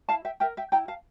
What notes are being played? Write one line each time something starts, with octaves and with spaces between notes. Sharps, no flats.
E4 F5 A5
E5 G5
A#4 E5 G5
E5 G5
E4 G5 A#5
F5 A5